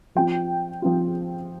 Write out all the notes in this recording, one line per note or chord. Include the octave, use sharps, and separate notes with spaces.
F3 C4 F4 G5
F3 C4 F4